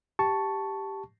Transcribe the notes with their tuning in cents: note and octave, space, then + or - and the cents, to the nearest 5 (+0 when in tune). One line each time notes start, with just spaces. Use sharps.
G4 +0 A5 +0 C#6 +0